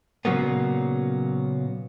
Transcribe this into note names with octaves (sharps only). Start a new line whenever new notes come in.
A#2 C#3 F#3 A#3 B3